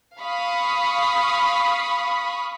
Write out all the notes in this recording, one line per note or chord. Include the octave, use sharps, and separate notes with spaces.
F5 B5 C#6 D#6